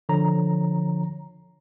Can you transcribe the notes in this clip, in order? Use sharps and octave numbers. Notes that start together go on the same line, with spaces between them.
D3 F3 C#5 A#5